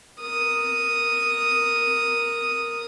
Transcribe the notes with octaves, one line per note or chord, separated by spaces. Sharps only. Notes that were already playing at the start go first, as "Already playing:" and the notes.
A#4 D#6